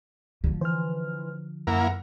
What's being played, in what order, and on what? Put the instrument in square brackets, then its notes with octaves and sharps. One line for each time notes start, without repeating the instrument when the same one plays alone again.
[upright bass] D3 F3
[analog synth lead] E3 [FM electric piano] C5 F6
[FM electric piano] F#2 [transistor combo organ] A#3 E4 A#4 [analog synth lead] F#5